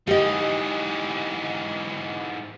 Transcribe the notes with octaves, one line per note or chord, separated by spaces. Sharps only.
G#2 E3 G4 D#5